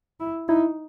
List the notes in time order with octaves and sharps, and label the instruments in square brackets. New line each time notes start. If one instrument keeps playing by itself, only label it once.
[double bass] E4
[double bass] D#4 [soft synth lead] E4